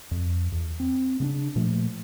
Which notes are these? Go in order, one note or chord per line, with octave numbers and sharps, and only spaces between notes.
F2
E2
C4
C#3 B3 D4
A#2 F3 A3